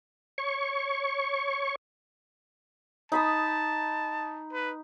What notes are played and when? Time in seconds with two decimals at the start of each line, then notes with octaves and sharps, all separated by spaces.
0.38 C#5 C#6
3.12 D#4 A5 B5 D#6
4.52 B4